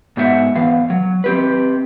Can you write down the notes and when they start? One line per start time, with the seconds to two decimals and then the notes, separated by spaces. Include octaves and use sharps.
0.17 G#2 B3 F#4 C5 E5 F#5
0.55 E2 B3 F5
0.90 F#3
1.24 C4 G4 B4